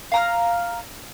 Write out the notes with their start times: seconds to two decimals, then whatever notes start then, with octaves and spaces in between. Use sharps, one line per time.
0.12 F5 A#5 F6